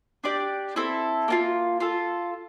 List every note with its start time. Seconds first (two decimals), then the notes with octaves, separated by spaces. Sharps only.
0.24 D4 G4 D5
0.76 C4 E4 A4
1.28 A#3 D4 F4
1.80 F4 A4